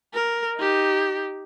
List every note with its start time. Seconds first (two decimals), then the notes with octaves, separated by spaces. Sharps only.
0.14 A#4
0.58 D#4 G4